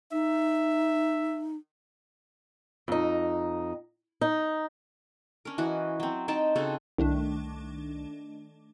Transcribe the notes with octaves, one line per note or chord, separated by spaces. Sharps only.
D#4 E5
F2 D#4
D#4
C#4 D4 A#4
E3 F#4 D#5
F#3 C4
C4 D#4 G5 A5
C#3 C4 F#4 A4
C2 D#3 A3 D4